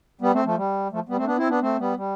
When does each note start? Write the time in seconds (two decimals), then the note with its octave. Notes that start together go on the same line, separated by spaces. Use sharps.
0.21 G3 B3
0.33 A3 C4
0.45 F3 A3
0.57 G3
0.92 F3 A3
1.09 G3 B3
1.17 A3 C4
1.26 B3 D4
1.37 C4 E4
1.49 B3 D4
1.61 A3 C4
1.79 G3 B3
1.97 G3